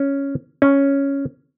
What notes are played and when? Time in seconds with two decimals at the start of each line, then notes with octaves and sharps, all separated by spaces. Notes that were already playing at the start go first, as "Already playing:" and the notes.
Already playing: C#4
0.62 C#4